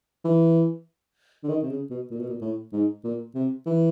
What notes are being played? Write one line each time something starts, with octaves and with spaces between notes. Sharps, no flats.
E3
D3
D#3
C3
C#3
B2
A#2
B2
A#2
A2
G#2
A#2
C3
E3